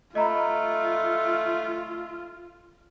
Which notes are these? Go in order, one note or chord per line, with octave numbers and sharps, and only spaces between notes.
A3 F4 D#5 A#5 B5